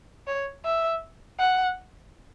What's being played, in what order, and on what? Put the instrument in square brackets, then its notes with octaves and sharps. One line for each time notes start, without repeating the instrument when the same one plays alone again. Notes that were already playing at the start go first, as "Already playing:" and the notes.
[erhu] C#5
E5
F#5